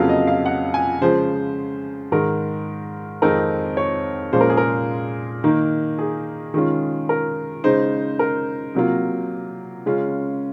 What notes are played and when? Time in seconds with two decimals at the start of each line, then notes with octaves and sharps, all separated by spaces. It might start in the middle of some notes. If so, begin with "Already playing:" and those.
Already playing: F2 C#3 F#3 A#3 F4 F5
0.09 D#5
0.27 F5
0.46 F#5
0.74 G#5
1.01 C#3 F3 G#3 C5
2.12 G#2 D#3 G#3 A#4
3.22 F2 D#3 G#3 C4 D#4 A#4
3.77 C#5
4.33 A#2 F3 G#3 C#4 F4 C5
4.41 A#4
4.50 G#4
4.57 A#4
5.44 D#3 A#3 D#4
5.99 G#4
6.54 D#3 G#3 C#4 F4
7.09 A#4
7.64 C#3 G#3 D#4 C5
8.19 A#4
8.75 C3 F#3 A#3 F4
9.86 C#3 G#3 C#4 F4